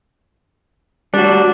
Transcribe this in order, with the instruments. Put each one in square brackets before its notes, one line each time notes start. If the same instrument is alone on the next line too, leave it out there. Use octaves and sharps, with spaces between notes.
[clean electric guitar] G3 F#4 [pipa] D4